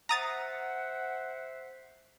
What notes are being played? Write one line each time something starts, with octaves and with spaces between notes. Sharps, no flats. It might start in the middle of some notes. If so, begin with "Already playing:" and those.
C5 E5 F#5 A#5 D#6 A6